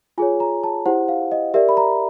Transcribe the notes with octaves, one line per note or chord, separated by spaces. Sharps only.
F4 G#4 C#5 G#5
A#5
A5
E4 G4 C5 F#5
F5
D#5
G4 A#4 D5 E5
B5
A#5